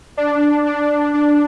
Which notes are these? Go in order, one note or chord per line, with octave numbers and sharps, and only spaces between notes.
D4
D4
D4